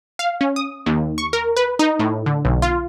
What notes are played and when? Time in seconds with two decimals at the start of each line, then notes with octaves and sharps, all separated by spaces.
0.19 F5
0.41 C#4
0.56 D#6
0.86 D#2
1.18 C#6
1.33 A#4
1.57 B4
1.79 D#4
2.00 A2
2.26 D3
2.45 B1
2.62 F4